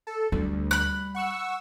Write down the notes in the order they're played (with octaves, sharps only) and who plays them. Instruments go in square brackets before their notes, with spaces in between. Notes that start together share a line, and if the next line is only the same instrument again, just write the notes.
[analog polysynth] A4
[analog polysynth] D2 [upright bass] G3
[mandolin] B5 F#6
[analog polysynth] F#5 C#6 E6